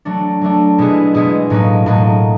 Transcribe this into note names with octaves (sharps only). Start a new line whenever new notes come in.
F#3 A3 D4
F#3 A3 D4
B2 G#3 B3 E4 G#4
B2 G#3 B3 E4 G#4
A2 F#3 A#3 D#4
A2 F#3 A#3 D#4